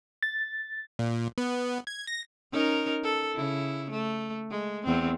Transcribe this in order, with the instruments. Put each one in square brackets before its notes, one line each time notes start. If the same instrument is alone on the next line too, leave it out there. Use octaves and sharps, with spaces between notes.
[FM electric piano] A6
[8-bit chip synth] A#2
B3
G#6
A#6
[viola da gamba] C#4 D#4 A#4
A4
C#3 E4
A3
G#3
E2 C4